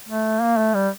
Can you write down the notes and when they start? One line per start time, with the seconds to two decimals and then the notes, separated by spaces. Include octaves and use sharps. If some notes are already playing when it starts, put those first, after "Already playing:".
0.09 A3
0.41 A#3
0.58 A3
0.74 G3